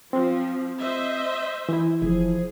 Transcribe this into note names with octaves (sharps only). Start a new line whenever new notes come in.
F3 C4
C5 D#5 E5
E3 E4
F1 F3 G#4